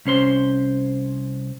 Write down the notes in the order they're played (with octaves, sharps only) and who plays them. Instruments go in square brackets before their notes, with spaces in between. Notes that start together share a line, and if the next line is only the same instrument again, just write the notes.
[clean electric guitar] C2 C#4 C5 C6